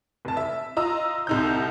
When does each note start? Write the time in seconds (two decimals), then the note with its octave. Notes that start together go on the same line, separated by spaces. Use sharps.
0.25 F1 A5
0.37 E5
0.76 F4 D#5 A#5 E6
1.27 C2 D#4 G6